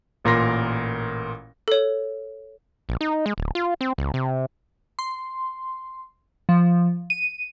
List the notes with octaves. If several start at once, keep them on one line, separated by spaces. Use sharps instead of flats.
A1 A#2 A#4 C6 A#6
A4 C#5
A#1
D#4
G#3
D1
F4
C4
C#2
C3
C6
F3
D#7